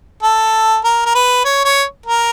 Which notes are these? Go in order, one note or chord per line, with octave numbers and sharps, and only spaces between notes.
A4
A#4
A#4
B4
C#5
C#5
A#4